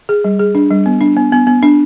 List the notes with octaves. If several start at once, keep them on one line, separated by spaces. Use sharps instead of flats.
G#4
G3
G#4
D4
G3
B3
D4
B3
B3
B3
D4